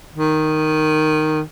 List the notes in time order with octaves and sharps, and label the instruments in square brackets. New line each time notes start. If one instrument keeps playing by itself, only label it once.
[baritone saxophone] D#3